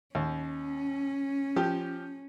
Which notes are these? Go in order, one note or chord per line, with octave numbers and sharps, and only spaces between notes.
D#2 C#4
F3 G4